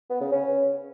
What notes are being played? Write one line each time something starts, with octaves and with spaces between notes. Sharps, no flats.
B3
C#3
C#4